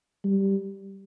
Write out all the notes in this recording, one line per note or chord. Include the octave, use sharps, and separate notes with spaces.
G3